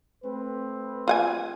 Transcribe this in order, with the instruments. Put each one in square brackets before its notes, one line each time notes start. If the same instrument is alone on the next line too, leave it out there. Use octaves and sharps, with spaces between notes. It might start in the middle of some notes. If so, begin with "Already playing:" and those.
[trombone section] A3 C4 B4
[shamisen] F4 F#5 G#5